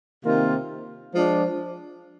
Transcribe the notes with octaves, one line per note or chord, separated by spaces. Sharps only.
C3 D#3 A#3 F4
F3 G#3 D4